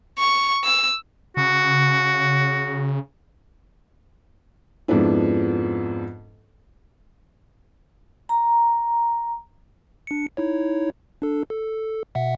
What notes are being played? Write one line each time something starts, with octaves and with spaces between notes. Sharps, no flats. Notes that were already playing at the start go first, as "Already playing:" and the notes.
C#6
E6
C#3 F#4
F2 G#2 F3 B3 D4 E4
A#5
D4 C#7
D#4 E4 C#5
D4 A4
A4
B2 E5 F#5